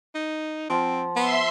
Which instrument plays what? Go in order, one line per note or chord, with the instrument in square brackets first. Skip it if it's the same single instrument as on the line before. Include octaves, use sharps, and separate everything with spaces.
[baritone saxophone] D#4
[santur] F3 F#5 [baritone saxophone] C4
[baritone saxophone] B3 [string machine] E5 C6